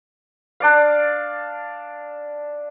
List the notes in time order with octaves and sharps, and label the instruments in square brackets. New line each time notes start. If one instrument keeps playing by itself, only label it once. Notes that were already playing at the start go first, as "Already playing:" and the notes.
[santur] D4 D5 F5